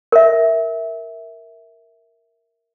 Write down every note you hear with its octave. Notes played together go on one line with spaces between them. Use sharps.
A#4 E5